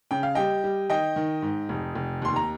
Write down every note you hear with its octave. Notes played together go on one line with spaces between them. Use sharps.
C#3 G5
F5
G3 D#5 G5
G3
D#3 D#5 G5
D#3
G#2
F1
F1
D#2 C6
A#5